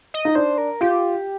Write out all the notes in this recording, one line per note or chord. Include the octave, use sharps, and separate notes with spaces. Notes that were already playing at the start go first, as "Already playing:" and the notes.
D#5
D#4
D4 C5
A#4
F4 G4